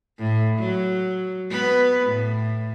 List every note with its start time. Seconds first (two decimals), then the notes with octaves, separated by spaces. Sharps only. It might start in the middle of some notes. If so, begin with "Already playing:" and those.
0.19 A2
0.59 F#3
1.50 B3 B4
2.06 A2